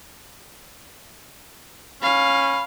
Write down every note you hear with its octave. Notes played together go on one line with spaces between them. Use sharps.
C#4 F5 B5